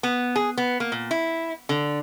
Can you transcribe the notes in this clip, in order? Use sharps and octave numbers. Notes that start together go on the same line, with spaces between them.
B3
G#4
B3
A#3
A#2
E4
D3